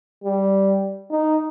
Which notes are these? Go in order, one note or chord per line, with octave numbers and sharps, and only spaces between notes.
G3
D#4